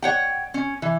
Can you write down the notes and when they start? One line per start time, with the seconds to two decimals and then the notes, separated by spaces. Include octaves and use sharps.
0.02 C#5 F#5 G5
0.54 C#4
0.82 E3